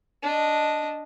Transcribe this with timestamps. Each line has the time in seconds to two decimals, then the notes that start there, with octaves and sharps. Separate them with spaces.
0.23 D4 D#5